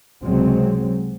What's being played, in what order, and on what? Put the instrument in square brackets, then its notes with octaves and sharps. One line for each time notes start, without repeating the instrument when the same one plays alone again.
[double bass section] C#2 C3 F#3 G#3 C4